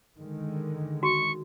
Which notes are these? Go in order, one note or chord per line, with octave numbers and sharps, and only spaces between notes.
D3 D#3 G#3
F#4 C#6